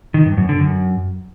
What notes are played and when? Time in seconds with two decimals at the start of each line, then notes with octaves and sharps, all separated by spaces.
0.14 D#3
0.26 G2
0.37 F#2
0.49 D3
0.60 F#2